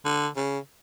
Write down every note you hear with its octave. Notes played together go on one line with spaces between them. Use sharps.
D3
C#3